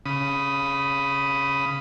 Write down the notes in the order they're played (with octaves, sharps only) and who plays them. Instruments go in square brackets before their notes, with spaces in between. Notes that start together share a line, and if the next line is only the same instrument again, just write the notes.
[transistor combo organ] C#3 B5 D#6